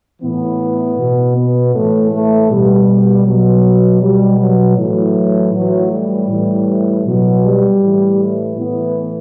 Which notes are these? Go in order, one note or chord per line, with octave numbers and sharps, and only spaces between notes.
A2 E3 B3
B2
B3
A2 E3 A3
A3
B2 G3
B2 F#3
B2 G3
F#3
A2 E3 F#3
A2 E3 F#3
G3
A2 E3
B2 F#3
G3
A2 E3
A2 E3 B3